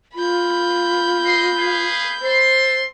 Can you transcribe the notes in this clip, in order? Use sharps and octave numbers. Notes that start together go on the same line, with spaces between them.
F4 B5 G6
D#5 C6
G#4 B4 F5
A4 C5 C6